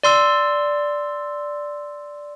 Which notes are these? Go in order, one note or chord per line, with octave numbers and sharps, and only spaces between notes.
D5 C6 E6